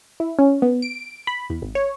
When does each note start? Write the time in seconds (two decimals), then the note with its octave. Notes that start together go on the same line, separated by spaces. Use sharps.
0.20 E4
0.39 C#4
0.62 B3
0.82 D7
1.27 B5
1.50 E2
1.62 G#1
1.75 C#5